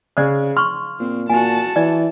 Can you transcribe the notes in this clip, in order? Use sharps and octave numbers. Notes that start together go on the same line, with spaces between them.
C#3 G#4 C5 D5
C6 C#6 F6
A#2 C4
A#2 F#4 G#5 A5
E3 D5